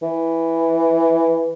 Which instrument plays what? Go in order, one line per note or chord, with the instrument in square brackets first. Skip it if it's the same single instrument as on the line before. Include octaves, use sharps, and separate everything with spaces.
[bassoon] E3